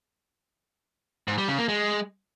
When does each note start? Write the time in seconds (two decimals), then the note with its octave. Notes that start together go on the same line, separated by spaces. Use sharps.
1.28 G#2
1.38 G3
1.48 C#3
1.58 A#3
1.69 G#3